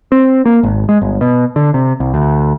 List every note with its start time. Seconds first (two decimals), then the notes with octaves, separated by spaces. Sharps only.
0.12 C4
0.46 A#3
0.63 G#1
0.89 G#3
1.02 G1
1.21 B2
1.56 D3
1.74 C3
2.00 C2
2.14 D2